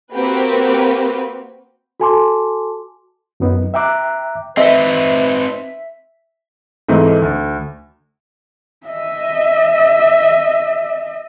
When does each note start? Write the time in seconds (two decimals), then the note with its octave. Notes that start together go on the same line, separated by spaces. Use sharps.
0.13 A#3 C4 F#4 G4 B4
2.00 F#4 A4 G#5 A5 C6 D6
3.40 F#2 F#3 B3 D#4
3.74 E5 G5 A#5 D6 F#6
4.57 C4 D#4 B4 D#5 E5 B6
6.88 G#2 E3 A3 C4 D#4
7.22 D2
8.86 D#5 E5